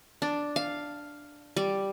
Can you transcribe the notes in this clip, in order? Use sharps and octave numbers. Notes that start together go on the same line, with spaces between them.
D4
F5
G3